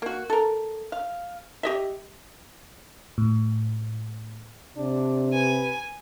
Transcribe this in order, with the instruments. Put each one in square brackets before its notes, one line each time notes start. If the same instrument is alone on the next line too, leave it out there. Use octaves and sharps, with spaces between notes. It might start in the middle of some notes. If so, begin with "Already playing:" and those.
[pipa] A#3 F#4
A4 A#4
F5
G4 D#5 E5
[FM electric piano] A2
[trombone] C3 [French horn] D4
[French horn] B4 [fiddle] G#5